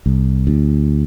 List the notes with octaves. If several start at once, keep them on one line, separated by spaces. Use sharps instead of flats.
C2
D2